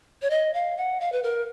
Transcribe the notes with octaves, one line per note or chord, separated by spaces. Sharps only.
C#5
D#5
F5
F#5
F5
B4
A#4